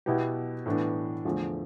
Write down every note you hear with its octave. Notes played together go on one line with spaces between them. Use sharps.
B2 B3 E4 G4
A2 E3 B3 D4
E2 D3 F3 A3